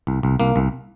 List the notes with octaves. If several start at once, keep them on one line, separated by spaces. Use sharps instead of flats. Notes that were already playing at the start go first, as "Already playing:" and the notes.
C2
C2
C2 A#3
C2